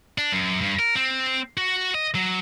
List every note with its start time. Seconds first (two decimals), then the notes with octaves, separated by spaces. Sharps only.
0.18 D4
0.32 F#2
0.61 G2
0.79 A#4
0.95 C4
1.57 F#4
1.95 D#5
2.15 F#3